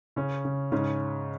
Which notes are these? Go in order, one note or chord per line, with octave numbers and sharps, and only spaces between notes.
C#3 C#4
C#3
G#2 C#3 C#4